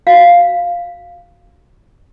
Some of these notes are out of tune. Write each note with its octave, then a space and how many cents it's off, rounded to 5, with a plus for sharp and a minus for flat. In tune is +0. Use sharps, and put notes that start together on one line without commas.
F#4 +0 F5 +0